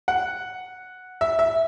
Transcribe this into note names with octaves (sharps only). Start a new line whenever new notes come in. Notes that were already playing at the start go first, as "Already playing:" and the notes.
F#5
E5
E5